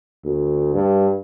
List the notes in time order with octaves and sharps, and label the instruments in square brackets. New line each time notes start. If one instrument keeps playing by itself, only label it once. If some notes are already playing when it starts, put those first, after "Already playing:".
[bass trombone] D2
G2